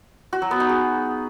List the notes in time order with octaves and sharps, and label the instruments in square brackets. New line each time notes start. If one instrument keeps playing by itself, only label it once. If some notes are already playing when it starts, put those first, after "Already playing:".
[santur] F#4
F#3
B3
D#4
G#4